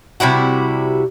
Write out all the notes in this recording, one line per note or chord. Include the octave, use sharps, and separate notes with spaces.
C3 G3 E4 F#4